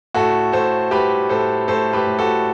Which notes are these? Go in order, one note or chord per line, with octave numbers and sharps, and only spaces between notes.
A2 F#4 A4
A2 A4 C5
G3 G4 B4
A2 A4 C5
A2 A4 C5
G4 B4
A2
F#4 A4